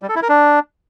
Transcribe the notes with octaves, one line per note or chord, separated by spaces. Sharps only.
G3
A4
E4
A#4
D4